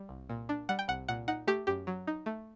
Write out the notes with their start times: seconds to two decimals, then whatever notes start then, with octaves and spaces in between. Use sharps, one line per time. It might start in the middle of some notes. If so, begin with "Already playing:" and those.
Already playing: G3
0.09 C2
0.30 A#2
0.49 D4
0.69 G3 F#5
0.79 G5
0.88 C2 F#5
1.08 A#2 F#5
1.28 D#4 F#5
1.47 A3 G4
1.67 F#2 G4
1.87 F#3
2.07 D#4
2.26 A3